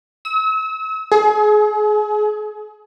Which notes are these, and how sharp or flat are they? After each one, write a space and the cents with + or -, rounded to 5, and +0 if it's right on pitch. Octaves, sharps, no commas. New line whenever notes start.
E6 -40
G#4 +35